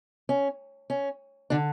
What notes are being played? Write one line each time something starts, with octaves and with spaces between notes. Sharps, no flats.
C#4
C#4
D3 D4